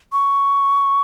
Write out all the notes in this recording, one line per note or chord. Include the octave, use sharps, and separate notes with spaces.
C#6